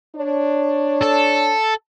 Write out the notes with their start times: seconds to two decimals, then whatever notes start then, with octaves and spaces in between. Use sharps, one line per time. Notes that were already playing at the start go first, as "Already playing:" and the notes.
0.16 D4 C#5
1.02 A4